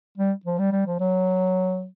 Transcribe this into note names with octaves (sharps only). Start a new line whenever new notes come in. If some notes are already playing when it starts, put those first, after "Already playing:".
G3
F3
G3
G3
F3
F#3